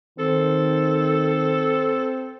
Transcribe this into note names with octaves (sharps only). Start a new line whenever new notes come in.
D#3 C4 A4